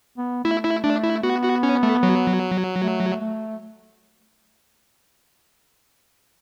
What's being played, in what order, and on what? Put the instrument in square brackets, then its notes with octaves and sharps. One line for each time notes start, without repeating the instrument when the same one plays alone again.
[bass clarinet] B3
[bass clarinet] A3 [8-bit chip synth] E4
[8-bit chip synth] E4
[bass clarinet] A3 [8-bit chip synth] D4
[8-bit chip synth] E4
[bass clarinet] B3 [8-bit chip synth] F#4
[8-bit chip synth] F#4
C#4
A3
F#3
[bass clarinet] A3
A3